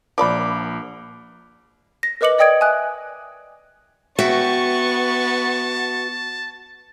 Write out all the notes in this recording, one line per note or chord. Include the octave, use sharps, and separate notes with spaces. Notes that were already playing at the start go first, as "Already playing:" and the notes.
A#1 F3 D5 B5 D6
A#6
A#4 B4 D#5 D6 C#7 F#7
D5 D#5 G5 D#6 G#6 D7
E5 G#5 D#6 F#6
B3 F#4 E5 G5 A5 C#6